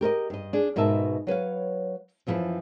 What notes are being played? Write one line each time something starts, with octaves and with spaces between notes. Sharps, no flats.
G4 A#4 C5 D#5
G2 D#5
D4 G#4
G#2 B2 A#4 B4 E5 A5
F#3 B4 C#5 F5
F#2 E3 F3 G#4 B4